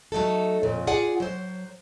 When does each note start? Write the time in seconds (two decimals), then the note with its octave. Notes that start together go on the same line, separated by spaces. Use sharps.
0.12 F#3 A3 D#4 A4
0.63 F2 A#2 C#3
0.87 F4 G#4 D5 F#5 G#5
1.20 F#3 C5